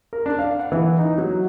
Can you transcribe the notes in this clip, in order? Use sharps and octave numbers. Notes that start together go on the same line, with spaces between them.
A#4
D4
F5
F#5
E3
D#4
F#3